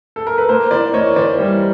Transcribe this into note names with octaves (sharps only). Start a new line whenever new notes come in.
A4
A#4
B4
A#3 A#4 C5
E3 C5 D5
A#3 C#5 D#5
E3 C5 D5
G3